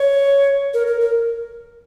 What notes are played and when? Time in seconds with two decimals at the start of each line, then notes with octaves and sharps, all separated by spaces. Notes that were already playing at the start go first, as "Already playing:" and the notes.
Already playing: C#5
0.74 A#4
0.87 A#4
1.01 A#4